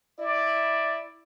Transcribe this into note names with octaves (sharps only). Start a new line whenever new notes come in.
E4 D5